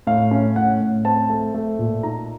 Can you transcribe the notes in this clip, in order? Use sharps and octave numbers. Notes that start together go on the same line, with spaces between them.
A2 F5
C#4
A2 F#5
A2
C4 A5
A3
A3
A#2
D#4 A#5